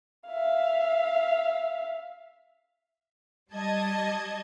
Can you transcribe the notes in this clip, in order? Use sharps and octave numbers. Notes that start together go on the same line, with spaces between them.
E5 F5
G3 D#5 A5 G#6